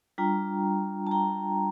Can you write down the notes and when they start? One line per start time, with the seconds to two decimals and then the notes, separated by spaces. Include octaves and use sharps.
0.18 G3 D4 F4 G5 A#5
1.07 A5
1.11 G5 A#5